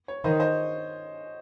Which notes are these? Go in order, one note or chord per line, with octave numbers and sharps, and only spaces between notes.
C#5
D#3 C5 D#5
C5 D#5